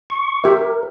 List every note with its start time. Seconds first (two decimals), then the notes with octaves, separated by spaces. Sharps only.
0.10 C#6
0.44 G4 A#4 E5